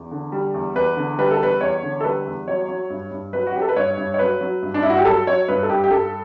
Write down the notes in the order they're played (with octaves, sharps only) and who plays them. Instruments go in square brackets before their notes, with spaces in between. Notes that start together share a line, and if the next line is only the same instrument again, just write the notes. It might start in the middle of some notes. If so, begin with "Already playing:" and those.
Already playing: [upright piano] E2
D3
G3
E2
E2 B4
D3
G3 B4
A4
E2 B4
E2 C#5
D3
A4
G3 B4
E2
F#3 C#5
F#3
G2
G2
F#3 B4
F#4
F#3 G4
A4
B4
G2 C#5
G2
C#5
F#3 B4
F#3
G2
D4
G2 E4
F#4
G4
F#3 A4
F#3 C#5
G2 B4
A4
G2 G4
G4
G2 A4